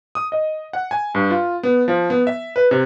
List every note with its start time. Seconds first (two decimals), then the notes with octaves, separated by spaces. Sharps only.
0.15 D#6
0.32 D#5
0.73 F#5
0.91 G#5
1.15 G2
1.30 F4
1.63 B3
1.88 F3
2.10 B3
2.27 E5
2.56 B4
2.71 C3